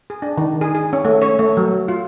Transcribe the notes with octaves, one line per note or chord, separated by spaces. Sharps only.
G#4
D4
D#3
G#4
G#4
C#4
A3
C#5
A3
F#3
F4